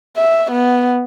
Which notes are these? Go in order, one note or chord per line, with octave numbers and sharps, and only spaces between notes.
E5
B3